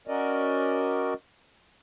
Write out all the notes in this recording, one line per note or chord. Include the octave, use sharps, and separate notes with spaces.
C#4 F#4 A#4 D5 D#5